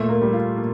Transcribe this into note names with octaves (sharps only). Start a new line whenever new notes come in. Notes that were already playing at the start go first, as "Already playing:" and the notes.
Already playing: A#2 A3
A#3
G3
F4
A#2